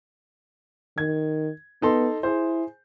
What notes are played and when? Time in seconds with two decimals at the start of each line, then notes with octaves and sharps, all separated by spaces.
0.98 D#3 G#6
1.82 B3 D#4 A4 C6
2.23 E4 G#4 C5